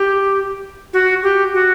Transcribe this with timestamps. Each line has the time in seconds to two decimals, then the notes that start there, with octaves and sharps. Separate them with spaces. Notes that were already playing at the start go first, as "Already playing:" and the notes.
Already playing: G4
0.93 F#4
1.23 G4
1.54 F#4